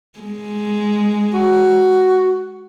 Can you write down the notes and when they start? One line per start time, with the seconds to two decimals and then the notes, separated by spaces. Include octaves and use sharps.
0.19 G#3
1.34 F#4